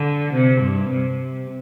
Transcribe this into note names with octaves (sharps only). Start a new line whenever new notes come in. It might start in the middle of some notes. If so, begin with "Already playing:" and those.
Already playing: D3
C3
G2
C3